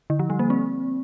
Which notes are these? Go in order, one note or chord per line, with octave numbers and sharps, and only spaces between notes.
D3
F3
G3
A#3
C4